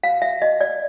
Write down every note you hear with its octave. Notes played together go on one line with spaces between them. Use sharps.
F5
E5
D#5
D5